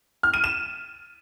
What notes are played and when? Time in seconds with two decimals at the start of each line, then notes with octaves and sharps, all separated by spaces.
0.23 F6
0.34 D#7
0.44 E7